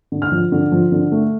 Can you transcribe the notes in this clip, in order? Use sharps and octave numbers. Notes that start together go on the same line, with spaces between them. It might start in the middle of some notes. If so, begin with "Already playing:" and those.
D3
F6
F3
D3
F3
D3
A3